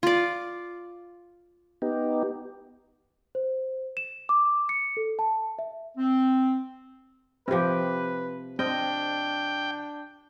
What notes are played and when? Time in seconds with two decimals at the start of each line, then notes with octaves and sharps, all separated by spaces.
0.03 F4 D5
1.82 B3 D#4 G4
3.35 C5
3.97 E7
4.29 D6
4.69 C#7
4.97 A4
5.19 A5
5.59 E5
5.97 C4
7.48 C3 F3 C4 G4 B4
8.59 C4 D4 D#5 G5